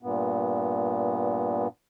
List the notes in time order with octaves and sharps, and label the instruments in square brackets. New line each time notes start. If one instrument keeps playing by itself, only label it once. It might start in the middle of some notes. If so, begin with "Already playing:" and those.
[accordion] G2 A#2 B3